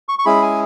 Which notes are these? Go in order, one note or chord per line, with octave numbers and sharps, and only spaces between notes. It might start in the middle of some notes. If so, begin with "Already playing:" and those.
C#6
C#6
G#3 C#4 E4 G#4 B5
G#5